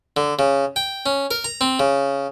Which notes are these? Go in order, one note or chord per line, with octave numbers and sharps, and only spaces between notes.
D3
C#3
G5
C#4
A#4
A#5
C4
C#3